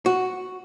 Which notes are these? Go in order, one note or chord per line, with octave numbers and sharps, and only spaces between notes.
F#4